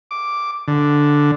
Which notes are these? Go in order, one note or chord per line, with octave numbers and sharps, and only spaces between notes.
D6
D3